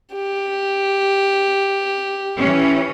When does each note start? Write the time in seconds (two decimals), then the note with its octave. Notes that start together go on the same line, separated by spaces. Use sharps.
0.15 G4
2.40 E3 C#4